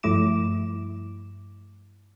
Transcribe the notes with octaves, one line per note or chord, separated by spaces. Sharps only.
G2 F3 A3 E4 D6 E7